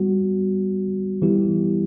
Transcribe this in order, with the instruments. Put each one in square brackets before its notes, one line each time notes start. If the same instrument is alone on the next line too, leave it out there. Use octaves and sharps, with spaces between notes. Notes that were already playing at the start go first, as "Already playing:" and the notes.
Already playing: [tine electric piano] G3 B3 F#4
E3 G3 B3 E4 G4